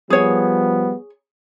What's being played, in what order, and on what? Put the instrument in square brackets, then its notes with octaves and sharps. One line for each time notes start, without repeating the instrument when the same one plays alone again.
[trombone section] F3 G3 B3 [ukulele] G#4 C#5